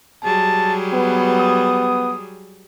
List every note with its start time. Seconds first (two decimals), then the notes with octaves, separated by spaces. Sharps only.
0.24 F#3 G3 G#4 A5
0.94 B3 B4
1.39 D#6